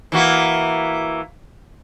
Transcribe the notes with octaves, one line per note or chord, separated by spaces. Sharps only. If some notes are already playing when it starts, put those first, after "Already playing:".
E3 A#3 F#4